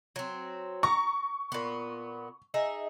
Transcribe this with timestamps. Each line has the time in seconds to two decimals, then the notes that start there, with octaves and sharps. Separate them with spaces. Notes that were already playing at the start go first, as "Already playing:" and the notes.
0.16 F#3 C4
0.83 A#5 C#6
1.52 A#2 B3
2.54 D#4 G#4 E5